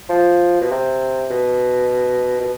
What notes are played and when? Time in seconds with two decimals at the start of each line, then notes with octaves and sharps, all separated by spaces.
0.09 F3
0.61 B2
0.71 C3
1.30 B2
2.41 B2